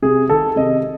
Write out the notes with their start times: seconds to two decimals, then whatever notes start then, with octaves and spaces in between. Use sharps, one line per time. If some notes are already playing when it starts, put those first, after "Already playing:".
0.02 C3 G#4
0.29 D#3 A4
0.56 C3 D#5